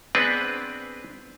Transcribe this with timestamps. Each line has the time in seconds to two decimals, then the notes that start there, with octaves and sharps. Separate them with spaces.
0.15 B3 C4 D4 G#4 B4